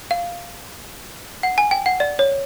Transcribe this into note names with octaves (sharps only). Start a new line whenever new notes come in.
F5
F#5
G#5
G5
F#5
D5
C#5